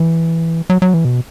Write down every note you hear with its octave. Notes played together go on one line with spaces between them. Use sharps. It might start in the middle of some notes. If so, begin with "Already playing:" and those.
Already playing: E3
F#3
F#3
E3
B2